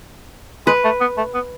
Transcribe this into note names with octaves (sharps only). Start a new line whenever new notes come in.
G#3 B4
A3
B3
A3
B3